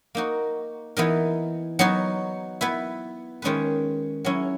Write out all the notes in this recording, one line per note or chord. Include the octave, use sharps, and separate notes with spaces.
A#3 D#4 F#4
E3 B3 D#4 A#4
F#3 B3 D#4 F#4
B3 E4 B4
D#3 G#3 C#4 G#4 B4
F#3 C#4 E4